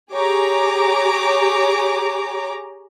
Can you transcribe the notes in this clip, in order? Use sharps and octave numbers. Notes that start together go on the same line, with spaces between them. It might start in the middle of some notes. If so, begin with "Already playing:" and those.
G4 G#4 C#5 A#5 D6